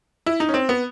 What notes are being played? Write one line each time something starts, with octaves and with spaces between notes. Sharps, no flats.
E4
D#4
C#4
C4
B3